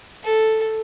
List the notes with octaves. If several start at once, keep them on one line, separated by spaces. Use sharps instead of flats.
A4